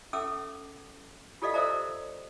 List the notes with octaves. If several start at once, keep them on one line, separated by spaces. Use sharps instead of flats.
C#4 A4 E5 D6 E6
F4 G4 A4 D5 D#5 F5
A4 A#4 C5 D5 E5 A#5